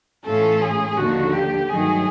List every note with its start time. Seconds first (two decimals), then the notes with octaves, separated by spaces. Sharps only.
0.25 A2 E3 A3 C#4 F4 A4
0.62 G#4
0.97 D#2 D3 F3 A#3 F#4
1.32 G4
1.69 G2 D#3 F#3 A3 G#4